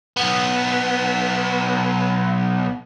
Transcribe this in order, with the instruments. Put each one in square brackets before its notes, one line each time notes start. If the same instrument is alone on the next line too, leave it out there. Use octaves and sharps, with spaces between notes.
[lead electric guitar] B1 B3